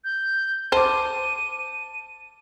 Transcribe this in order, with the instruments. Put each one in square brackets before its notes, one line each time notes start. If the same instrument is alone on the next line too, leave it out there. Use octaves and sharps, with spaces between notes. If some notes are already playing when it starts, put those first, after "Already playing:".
[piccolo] G6
[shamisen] C5 [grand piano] A5 D6 [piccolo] D#7